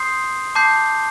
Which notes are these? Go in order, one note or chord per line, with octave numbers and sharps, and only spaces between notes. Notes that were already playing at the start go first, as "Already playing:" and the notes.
Already playing: C6 D#6 G6 C7
A5 D6 G6 C7